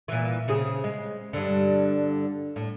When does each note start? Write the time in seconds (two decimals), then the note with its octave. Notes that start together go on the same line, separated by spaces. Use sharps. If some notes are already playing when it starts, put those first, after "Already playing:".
0.08 A#2 E3
0.48 C#3 C4 G#4
0.84 G#3
1.33 G2 D3
2.56 A2